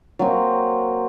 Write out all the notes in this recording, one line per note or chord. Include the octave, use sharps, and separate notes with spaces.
F#3 A#3 C4